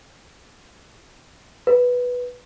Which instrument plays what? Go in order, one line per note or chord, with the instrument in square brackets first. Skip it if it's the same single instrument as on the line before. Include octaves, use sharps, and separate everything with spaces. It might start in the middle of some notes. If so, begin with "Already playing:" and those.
[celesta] B4